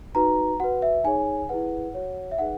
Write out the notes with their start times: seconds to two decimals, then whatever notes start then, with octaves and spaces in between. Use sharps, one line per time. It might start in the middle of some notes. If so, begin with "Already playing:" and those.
0.15 D#4 F#4 B4 A#5
0.60 F#4 B4 F#5
0.82 E5
1.04 D#4 G#4 C#5 G#5
1.49 E4 G#4 B4 F#5
1.94 F#4 C#5
2.32 E5
2.38 D#4 G#4 B4 F#5